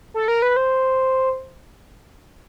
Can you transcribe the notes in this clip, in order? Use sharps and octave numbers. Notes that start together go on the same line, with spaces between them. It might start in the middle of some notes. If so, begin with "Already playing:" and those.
A4
A#4
B4
C5